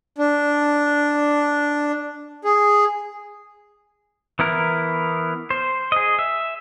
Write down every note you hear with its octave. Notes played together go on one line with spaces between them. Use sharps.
D4
G#4
E3 B3 E4 A#4
C5
G#4 D#5
E5